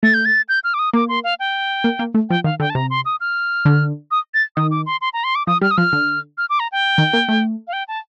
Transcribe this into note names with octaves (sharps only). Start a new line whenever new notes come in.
A3 A6
G6
A6
G6
F6
D6
D#6
A#3 D6
C6
F5
G5
A#3
A#3
A3
F3 G5
D#3 F5
D3 G5
A5
C3 A#5
C6
D#6
F6
D3
D#6
A6
D#3 D#6
D6
C6
C6
A#5
C6
D6
F3 D#6
G3 F6
D#6
F3 F6
D3
F6
D6
A#5
G5
D#3
A#3
A3
F5
G5
A5